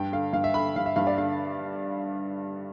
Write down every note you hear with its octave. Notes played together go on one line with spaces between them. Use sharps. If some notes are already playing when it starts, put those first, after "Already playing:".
Already playing: G2 G5
D3 F5
G2 F5
E5
D3 B5
G2 F5
E5
G2 F5
D5
D3 F5